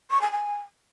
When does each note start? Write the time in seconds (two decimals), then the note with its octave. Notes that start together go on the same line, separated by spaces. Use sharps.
0.11 C#6
0.21 G#5
0.32 G#5